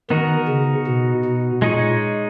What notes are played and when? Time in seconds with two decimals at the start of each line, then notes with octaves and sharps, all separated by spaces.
0.10 D#3 B3 D#4 F#4 A#4
0.48 C#3
0.87 B2
1.25 B2
1.62 A#2 G#3 D#4 G#4 C#5